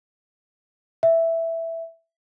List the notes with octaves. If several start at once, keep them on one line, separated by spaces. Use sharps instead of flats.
E5